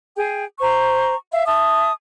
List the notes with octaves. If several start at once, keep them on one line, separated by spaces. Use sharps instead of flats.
G#4 G5
C5 A#5 C#6
E5 F5
E5 A5 D#6